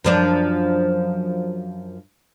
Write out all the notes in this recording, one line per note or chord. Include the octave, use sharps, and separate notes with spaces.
F#2 F3 D4